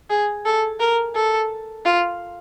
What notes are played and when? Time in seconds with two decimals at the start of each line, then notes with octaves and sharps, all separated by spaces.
0.10 G#4
0.45 A4
0.80 A#4
1.15 A4
1.85 F4